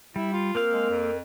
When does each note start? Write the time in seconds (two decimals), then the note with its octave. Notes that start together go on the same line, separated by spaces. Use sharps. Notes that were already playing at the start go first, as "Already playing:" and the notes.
0.16 G3 E4
0.33 F4
0.55 A#3 C4 A#4 F5
0.72 G#3
0.89 F2